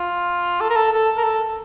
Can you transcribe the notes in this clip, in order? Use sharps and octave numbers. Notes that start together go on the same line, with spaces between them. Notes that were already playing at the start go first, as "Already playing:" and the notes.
Already playing: F4
A4
A#4
A4
A4
A#4
A4